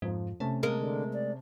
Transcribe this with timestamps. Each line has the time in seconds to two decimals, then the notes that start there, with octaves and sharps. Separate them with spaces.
0.02 F2 G#2 F3
0.40 C3 A3 C#4 A5
0.63 G#3 A#3 A#4
0.80 D3
1.13 D5